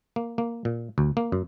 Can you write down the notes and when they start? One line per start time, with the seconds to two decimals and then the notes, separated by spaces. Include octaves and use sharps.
0.16 A#3
0.38 A#3
0.65 A#2
0.98 D2
1.17 A#3
1.32 F#2